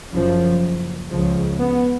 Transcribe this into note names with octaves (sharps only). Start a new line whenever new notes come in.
F#1 F#2 C#3 F3
C#2 C#3 F3
B3